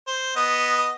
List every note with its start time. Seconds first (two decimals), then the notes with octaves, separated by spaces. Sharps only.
0.07 C5
0.36 B3 D#5